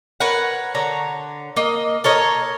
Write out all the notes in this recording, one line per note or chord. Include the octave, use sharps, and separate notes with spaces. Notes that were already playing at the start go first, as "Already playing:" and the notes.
A#4 B4 C#5 F#5
D3 C#5 A#5
A#3 D#5
A4 A#4 C#5 D#5